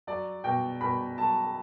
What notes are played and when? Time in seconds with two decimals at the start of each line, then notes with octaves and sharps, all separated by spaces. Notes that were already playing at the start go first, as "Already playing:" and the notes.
0.07 F#3 D5
0.44 B2 G5
0.81 B2 B5
1.18 F#3 A5